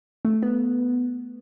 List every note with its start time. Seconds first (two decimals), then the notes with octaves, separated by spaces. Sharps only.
0.25 A3
0.42 B3